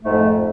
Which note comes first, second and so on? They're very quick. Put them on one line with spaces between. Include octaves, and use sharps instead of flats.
A3 G#2 F2